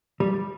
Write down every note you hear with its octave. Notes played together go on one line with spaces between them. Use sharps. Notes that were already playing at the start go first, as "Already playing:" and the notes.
G3